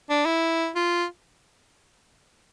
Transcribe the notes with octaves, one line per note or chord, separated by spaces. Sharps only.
D4
E4
F4